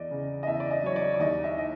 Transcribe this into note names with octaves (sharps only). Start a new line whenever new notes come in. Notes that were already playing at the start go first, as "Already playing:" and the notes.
Already playing: E2 D5 D#5
C#3
D#5
E2 E5
D5
D#5
F#3 C#5
D5
D5
D#2 D#5
E5
D#3 D#5